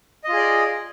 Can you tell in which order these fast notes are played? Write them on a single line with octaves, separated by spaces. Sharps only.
D#5 F4 G#4 D5